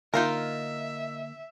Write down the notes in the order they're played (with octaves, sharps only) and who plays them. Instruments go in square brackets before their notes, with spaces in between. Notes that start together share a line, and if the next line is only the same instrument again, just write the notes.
[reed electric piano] D3 A#3 [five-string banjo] D#4 F4 A#4 [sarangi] E5